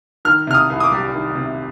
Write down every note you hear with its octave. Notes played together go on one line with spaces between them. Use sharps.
D#3 F6
C3 F6
D#6
C2
D#6
D6
G3
D#3
C3